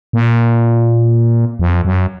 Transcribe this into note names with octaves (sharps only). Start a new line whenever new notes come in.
A#2
F2
F#2